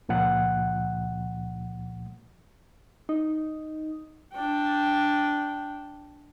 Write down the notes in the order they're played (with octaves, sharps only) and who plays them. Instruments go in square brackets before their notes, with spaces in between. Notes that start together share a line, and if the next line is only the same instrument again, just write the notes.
[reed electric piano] C#2 A#2 F3 F#5 F#6
[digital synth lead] D#4
[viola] D4 G5